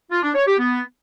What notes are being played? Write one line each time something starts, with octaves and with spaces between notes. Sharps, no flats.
F4
D4
C#5
G4
B3